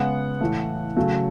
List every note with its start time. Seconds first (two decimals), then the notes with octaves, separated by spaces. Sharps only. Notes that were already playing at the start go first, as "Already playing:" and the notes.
Already playing: C#3 G#3 B3 F#5
0.41 A2 E3 A3
0.97 C#3 F#3 A3